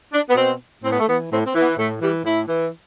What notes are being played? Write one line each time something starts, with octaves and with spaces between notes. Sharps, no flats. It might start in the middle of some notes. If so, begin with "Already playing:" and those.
D4
B3
B2 C4
A2 C4
B3
A3
E3 B3
A2 C4
C4
E3
B3
A2 A3
E3 G3
A2 E4
E3